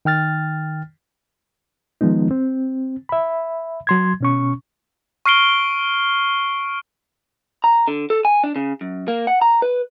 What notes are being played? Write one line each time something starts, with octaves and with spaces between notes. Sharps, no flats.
D#3 G5 F6 A6
D#3 F3 G#3 B3 D#4
C4
E5 B5
F#3 C6 G#6
B2 C#4 C#6
C#6 F6 C7 D7 G7
A#5
D3
A4
G#5
D4
C#3
F#2
A#3
F#5
A#5
B4